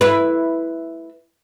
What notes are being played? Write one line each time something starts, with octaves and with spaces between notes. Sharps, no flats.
E4 B4